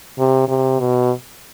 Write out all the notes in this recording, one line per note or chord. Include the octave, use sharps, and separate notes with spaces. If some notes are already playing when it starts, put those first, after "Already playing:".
C3
C3
B2